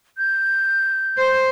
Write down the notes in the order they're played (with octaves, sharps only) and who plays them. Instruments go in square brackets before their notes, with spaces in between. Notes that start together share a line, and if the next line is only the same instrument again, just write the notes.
[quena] G6
[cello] C5